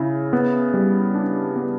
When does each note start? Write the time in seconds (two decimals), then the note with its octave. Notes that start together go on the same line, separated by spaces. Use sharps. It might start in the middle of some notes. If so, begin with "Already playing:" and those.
Already playing: C#3 E4
0.33 B3
0.74 G3
1.15 D4
1.56 B3